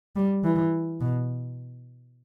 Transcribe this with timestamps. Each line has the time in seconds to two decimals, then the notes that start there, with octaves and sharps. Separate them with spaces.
0.16 G3
0.44 E3
1.01 B2